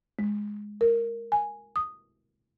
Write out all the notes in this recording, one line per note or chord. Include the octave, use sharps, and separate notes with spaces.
G#3
A#4
G#5
D#6